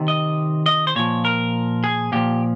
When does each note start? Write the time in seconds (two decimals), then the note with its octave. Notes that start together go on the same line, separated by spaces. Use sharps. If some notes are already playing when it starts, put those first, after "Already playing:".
Already playing: C3 D#3
0.08 D#5
0.66 D#5
0.87 C5
0.96 A#2 F3 C#5
1.25 A#4
1.84 G#4
2.12 A#2 F3 G4